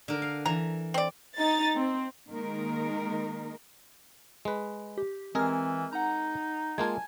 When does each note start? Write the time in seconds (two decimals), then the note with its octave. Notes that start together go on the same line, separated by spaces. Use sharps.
0.08 D3 A#4
0.22 F5
0.45 E3 A#5
0.94 C4 D5
1.37 D#4 A6
1.76 C4
2.31 D#3 G#3 A#3 D#4 A#4
4.45 G#3 B4
4.98 G4
5.35 E3 G#3 C4 G#4 A#4 F6
5.93 D#4 F#5 A#5
6.78 G#3 A#3 F4 G#5 A5 G#6